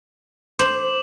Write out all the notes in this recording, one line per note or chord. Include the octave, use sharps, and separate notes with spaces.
C5 D6 E7 F#7